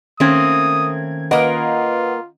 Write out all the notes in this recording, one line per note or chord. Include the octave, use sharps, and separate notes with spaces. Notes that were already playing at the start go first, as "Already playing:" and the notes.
D#3 A3 A#3 C4 C#4 D#6 G#6
A#3 F4 A#4 B4 D#5 F#5